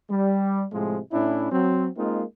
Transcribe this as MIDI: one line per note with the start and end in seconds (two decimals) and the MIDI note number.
0.11 0.64 55
0.73 0.99 45
0.73 0.99 48
0.73 0.99 53
0.73 0.99 56
1.12 1.50 45
1.12 1.50 61
1.12 1.50 62
1.12 1.50 64
1.52 1.89 54
1.52 1.89 60
1.97 2.24 56
1.97 2.24 58
1.97 2.24 60
1.97 2.24 63
1.97 2.24 65